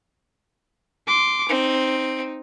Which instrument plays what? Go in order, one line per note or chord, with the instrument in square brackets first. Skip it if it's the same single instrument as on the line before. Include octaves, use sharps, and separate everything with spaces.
[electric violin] C6 D6
[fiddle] C4 [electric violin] D#4